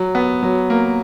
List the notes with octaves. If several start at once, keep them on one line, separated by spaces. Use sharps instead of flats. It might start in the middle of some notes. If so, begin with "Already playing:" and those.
Already playing: F#3
B3
F#3
A#3